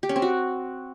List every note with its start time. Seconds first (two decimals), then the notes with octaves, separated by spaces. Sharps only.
0.03 G4
0.09 C#4
0.16 C4
0.22 F#4